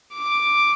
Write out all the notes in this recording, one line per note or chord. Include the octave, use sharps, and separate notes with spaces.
D6